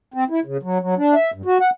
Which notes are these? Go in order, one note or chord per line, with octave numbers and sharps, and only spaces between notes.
C4
E4
C#3
F#3
F#3
D4
E5
G2
F#4
F#5